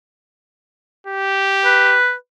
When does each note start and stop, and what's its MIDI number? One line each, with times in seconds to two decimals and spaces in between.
1.07 1.98 67
1.65 2.14 71